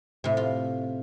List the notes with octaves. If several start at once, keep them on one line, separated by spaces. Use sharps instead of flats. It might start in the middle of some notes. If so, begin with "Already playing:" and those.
A2 C3
F4